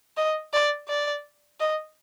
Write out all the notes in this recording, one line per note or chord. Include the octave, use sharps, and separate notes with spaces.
D#5
D5
D5
D#5